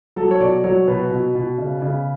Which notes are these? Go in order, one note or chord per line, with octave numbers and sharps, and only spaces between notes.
F#3 A4
C#5
B2 D5
F#3 C#5
B2 B4
B2
B2
C#3
C#3